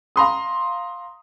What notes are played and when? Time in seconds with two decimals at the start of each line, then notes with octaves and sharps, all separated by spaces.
0.16 F5 A#5 C6 D#6